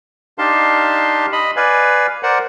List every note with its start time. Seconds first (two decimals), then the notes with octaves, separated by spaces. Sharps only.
0.38 D4 D#4 G4 F5 A5 C6
1.32 D#5 B5
1.56 B4 D5 F5 G#5
2.23 A#4 C5 D5 F#5